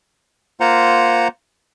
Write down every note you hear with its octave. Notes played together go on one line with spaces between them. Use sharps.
A#3 F4 C5 F#5 A#5